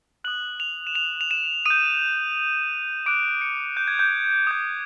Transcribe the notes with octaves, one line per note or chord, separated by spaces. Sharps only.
D#6 F#6 F#7
F7
E7
F7
F7
E7
D#6 G6 D#7
D6 F#6 D7
C#7
G6
G#6
G6
D#6 G6